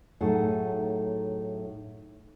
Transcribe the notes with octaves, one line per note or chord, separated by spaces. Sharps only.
A2 F#3 D#4 G#4 A4 F#5